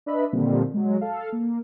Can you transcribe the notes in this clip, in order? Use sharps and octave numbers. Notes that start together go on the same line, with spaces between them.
D4 B4 D#5 E5 B5
A#2 D3 D#3 F3 G3 C4
F#3 G#3
A4 F5
A#3